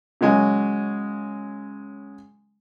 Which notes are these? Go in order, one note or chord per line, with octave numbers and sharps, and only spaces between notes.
C#3 F#3 G#3 G#5